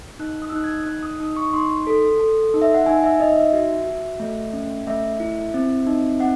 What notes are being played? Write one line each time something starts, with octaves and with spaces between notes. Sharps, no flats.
D#4 F#6
D#6
E6
D#4 F#6
G#6
D#4 F#6
D#6
D#4 D#6
C#6
D#4 C6
A4
A4
D#4
E5
F#5
D#4 G#5
E5
D#4 D#5
E5
F#4 E5
F#4
A3
C#4
A3 E5
E4
C4
D#4
C4 F#5